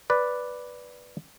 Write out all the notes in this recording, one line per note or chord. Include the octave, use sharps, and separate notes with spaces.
B4 D5